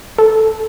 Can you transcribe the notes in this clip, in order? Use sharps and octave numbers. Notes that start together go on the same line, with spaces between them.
A4